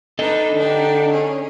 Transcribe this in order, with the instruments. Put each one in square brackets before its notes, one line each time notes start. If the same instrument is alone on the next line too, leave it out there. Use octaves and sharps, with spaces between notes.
[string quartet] D4 D#4 B4 [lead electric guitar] A4 D#5
[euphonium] D3 [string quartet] D4 D#4 G4
[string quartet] C#4 G#4